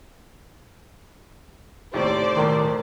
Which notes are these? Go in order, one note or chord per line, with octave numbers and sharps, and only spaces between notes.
D#2 A2 C3 C5 D5
B1 A2 D#3 C6